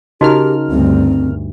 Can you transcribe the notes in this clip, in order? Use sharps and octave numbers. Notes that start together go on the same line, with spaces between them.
C#3 D#4 F#4 G4 A#4 D#5 F6
D2 G2 C4